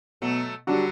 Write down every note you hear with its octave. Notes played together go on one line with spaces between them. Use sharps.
B2 F#3 A3
D3 F#3 G3 D4 F#4